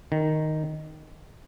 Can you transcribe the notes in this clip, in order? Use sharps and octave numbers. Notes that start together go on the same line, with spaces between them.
D#3